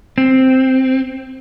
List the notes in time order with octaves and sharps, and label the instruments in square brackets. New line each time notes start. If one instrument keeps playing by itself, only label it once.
[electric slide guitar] C4